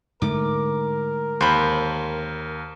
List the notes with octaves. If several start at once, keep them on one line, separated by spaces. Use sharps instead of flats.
G#2 D3 A3 A#4 D6
D#2 C5 B5